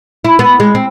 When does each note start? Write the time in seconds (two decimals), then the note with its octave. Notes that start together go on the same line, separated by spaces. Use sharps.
0.25 E4
0.39 B3
0.60 G#3
0.75 C4